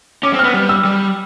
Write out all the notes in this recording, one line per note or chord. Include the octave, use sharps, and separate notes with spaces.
C#4 D6
C4
F6
B3
G3 F6
E6
G3